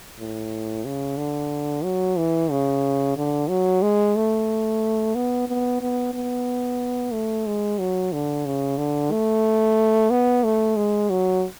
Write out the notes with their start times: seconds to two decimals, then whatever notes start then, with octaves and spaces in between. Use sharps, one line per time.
0.19 A2
0.85 C#3
1.18 D3
1.84 F#3
2.18 E3
2.51 C#3
3.17 D3
3.49 F#3
3.82 G#3
4.16 A3
5.15 B3
5.48 B3
5.81 B3
6.14 B3
7.13 A3
7.46 G#3
7.79 F#3
8.13 D3
8.46 C#3
8.78 D3
9.11 A3
10.10 B3
10.44 A3
10.77 G#3
11.10 F#3